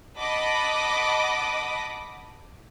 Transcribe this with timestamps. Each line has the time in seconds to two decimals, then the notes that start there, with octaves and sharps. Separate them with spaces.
0.18 D#5 F#5 A5 B5 D6 D#6